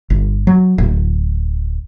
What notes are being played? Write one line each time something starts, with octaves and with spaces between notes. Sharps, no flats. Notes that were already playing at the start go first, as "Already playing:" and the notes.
G1
F#3
D1